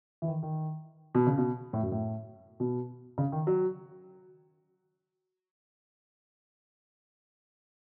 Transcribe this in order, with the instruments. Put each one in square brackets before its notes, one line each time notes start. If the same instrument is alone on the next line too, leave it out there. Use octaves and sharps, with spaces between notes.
[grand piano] E3
D#3
D#3
B2
C#3
B2
A2
F#2
A2
B2
C#3
D#3
F#3